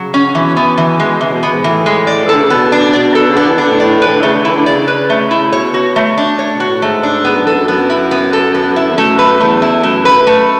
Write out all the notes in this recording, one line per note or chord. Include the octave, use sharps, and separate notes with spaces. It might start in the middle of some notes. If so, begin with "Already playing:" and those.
Already playing: C#3 F#3
C#4
B2 E3
B3
E3
G#3
C#3 E3
B2
B2 B3
G#2
A2 E3
G#3
D5
E3
D3 A4
C#3
B2 B3
D4
B2 D5
A4
C#3
D3 B3
E3
D3 D4
A2
A2 D5
E3 B4
D3
C#3 A3
D3
D3 E3 E4
D3
C#3 D5
B4
A3
E4
C#3
B2 C#5
F#4
A3
D4
C#5
B2
F#4
A2
G#2 A3
D4
G#2 B3
F#2
E2 A4
F#2
F#2 B3
E4
B3
A4
B3
E4
E2
F#2 A3
B4
E2 A3
E4
F#2 A3
B4
A3